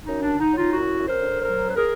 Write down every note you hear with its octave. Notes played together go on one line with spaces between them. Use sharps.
F#2 D#4
D4
D3
D#4
F#3
D#4 F4
F#2 E4 F#4
F#2
A#4 C5
D3
F#3 A#4 C5
F#2 B4
G#4 A#4